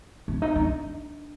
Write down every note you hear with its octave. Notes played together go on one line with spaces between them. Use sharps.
D4
D#4
D4